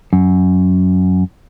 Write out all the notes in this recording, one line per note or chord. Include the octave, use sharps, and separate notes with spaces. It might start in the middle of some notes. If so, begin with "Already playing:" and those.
F#2